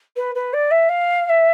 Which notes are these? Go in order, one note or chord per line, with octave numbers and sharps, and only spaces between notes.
B4
B4
D5
E5
F5
F5
E5